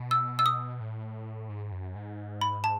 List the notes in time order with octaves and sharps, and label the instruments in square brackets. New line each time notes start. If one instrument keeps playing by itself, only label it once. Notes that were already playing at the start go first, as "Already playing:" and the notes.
Already playing: [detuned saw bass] B2
[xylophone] E6
E6
D#6
[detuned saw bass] A2
G#2
F#2
G#2
[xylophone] B5
A5